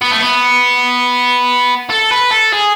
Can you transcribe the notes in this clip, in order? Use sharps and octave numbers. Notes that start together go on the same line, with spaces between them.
B3
A3
B3
A4
B4
A4
G#4